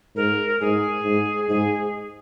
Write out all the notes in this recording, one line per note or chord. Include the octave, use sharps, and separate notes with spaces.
G#2 A#4
G#2 G#4
G#2
G#2 G#4